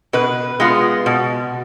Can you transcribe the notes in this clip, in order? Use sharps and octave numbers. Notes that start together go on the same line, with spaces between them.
B2 B4
G#3 B3 F4
B2